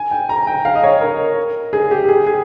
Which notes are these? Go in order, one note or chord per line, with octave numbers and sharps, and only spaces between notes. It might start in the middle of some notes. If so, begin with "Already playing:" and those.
Already playing: G#5
G5
A#5
G5
F5
D#5
C#5
A#4
G#4
G4
G#4
G#4